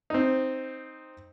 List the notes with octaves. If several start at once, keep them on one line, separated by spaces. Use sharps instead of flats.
C4 D#4